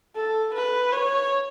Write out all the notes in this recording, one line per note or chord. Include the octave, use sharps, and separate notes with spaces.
A4
B4
C#5